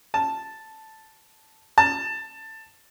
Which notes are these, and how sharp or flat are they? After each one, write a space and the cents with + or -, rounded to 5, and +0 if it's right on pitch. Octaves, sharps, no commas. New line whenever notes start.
A5 +0
A5 +15